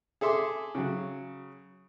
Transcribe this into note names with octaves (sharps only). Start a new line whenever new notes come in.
G#4 A4 E5 C6 D6
C#3 F#3